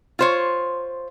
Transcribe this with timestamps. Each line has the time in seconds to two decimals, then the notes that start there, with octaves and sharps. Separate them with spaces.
0.19 F4 C5 C#5